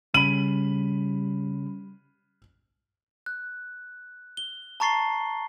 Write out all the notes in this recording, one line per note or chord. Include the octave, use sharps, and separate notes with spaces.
C#3 G3 C#4 B5 D#7 F#7
F#6
G7
A5 A#5 C#6 A6 C7 G7